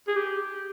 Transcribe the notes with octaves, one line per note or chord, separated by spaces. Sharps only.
G#4
G4